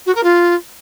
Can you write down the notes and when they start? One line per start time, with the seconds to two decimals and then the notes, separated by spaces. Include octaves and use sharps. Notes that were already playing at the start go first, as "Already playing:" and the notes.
0.06 F#4
0.14 A#4
0.23 F4